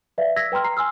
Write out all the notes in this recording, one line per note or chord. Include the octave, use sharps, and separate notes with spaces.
B4 D5 E5 F5
E6 G#6 A#6 B6
B4 G5 A#5 C6 F6
A#5 C7
G#5 C6 E6 F6